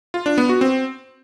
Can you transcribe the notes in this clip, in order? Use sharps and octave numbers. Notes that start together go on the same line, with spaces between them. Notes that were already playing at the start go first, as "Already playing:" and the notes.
F4
D4
B3
F#4
C4